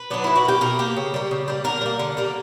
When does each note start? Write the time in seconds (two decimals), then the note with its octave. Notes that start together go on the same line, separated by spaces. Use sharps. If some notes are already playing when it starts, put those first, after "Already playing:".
Already playing: B4
0.10 F#3 B3 D4
0.24 B2 E4
0.36 F#4
0.45 A#3 G4
0.61 B2 A#4
0.79 A#3 G4
0.96 C#3
1.14 G3 A#3
1.31 C#3
1.48 G3 A#3
1.64 D3 A#4
1.81 G3 A#3
1.99 D3
2.17 G3 A#3